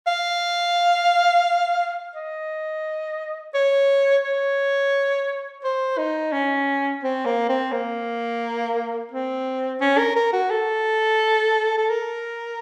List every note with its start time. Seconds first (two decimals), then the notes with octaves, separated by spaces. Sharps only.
0.07 F5
2.16 D#5
3.54 C#5
4.24 C#5
5.64 C5
5.98 D#4
6.33 C#4
7.03 C4
7.26 A#3
7.49 C4
7.72 A#3
9.12 C4
9.81 C#4
9.98 A#4
10.16 A#4
10.33 F#4
10.51 A4
11.78 A4
11.90 A#4